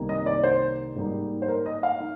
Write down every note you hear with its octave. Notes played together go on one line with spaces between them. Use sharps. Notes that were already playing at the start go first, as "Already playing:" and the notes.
Already playing: C2 C3 D#3 A#3 D#4
D#5
D5
C5
G#2 G3 A#3 D#4
C5
A#4
D#5
F5
D#4